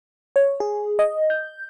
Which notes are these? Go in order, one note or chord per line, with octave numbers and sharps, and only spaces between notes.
C#5
G#4
D#5
G6